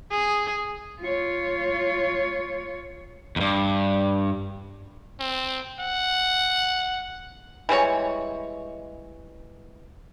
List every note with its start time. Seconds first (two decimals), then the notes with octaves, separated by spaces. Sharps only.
0.11 G#4
1.00 F4 C#5
3.36 E2 G2
5.20 C4
5.79 F#5
7.69 E3 G3 G#3 C#5